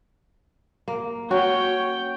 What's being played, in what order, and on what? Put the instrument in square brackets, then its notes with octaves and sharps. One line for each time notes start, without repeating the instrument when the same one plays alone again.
[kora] A#3
[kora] C#4 F#4 [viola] C#5 G5